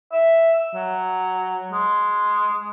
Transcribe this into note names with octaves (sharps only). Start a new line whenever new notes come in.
E5
F#3
G#3